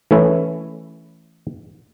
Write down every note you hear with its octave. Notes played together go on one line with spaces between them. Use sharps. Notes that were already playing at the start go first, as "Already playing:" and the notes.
E3 A3 C#4 E4